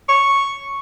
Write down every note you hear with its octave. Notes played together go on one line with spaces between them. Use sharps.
C#6